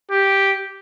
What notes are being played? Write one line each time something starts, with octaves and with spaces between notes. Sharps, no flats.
G4